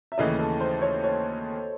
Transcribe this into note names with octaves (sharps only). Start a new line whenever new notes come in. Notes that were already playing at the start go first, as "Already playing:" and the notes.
E5
D#2 C#3 E3 A3 D#5
A4
C5
C#5
C#5